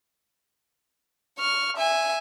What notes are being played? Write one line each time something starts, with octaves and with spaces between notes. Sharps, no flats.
C#6 F6
E5 G#5